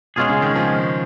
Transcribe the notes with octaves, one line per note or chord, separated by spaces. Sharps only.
B2 G#3 C#4 F4 G#4
C#3
D#3
F3